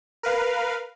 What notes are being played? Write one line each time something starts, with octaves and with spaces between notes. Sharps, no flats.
A#4 B4 F5